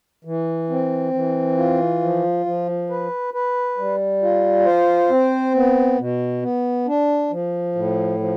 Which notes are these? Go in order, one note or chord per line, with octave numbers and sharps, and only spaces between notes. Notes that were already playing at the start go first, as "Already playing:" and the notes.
E3
C4
E3
F4
F3
F3
B4
B4
G3
F4
C5
C4
B3
B2
B3
D4
F3
A2
F3